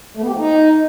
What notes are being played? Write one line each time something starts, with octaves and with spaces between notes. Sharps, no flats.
A3
B3
G4
F3
D#4